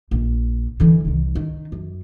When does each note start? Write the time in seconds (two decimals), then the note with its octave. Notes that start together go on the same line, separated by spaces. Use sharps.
0.11 A#1
0.80 D3 E3
1.05 C2 D#3
1.35 D#3
1.72 F#2